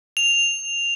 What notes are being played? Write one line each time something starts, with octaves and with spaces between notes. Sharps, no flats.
F7